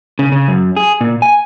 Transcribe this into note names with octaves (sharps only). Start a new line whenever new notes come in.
C#3
C#3
F#2
G#4
A#2
G#5